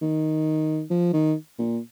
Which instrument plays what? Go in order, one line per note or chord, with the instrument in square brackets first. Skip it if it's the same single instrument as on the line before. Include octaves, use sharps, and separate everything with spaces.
[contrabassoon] D#3
F3
D#3
A#2